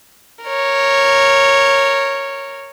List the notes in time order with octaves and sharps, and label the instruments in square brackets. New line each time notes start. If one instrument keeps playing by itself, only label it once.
[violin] A#4 C#5